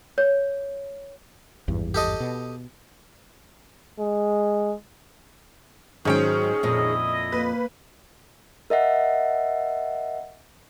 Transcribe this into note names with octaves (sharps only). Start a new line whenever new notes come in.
C#5
G#1 E2 G2
G4 A4 D#5
B2
G#3
G#2 D#3 F#3 C#4 G#4 G5
F2 A#2 E4 D#5
A#3 B4
A#4 D#5 E5 F#5